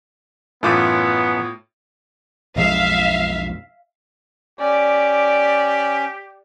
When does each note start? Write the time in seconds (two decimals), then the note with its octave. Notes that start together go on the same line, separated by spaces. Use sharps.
0.63 F#2 A2 E3 A3 B3 F4 D6
2.56 B1 F2 G#3 E5 F5
4.60 C#4 G4 D5